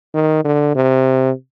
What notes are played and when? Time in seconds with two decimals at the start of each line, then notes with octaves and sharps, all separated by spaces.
0.14 D#3
0.45 D3
0.75 C3